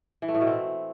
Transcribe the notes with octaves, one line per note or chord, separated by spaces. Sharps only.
E3
A3
A2
B2
C4